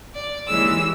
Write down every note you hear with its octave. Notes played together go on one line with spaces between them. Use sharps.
D5
D#2 E3 G#3 C#4 E6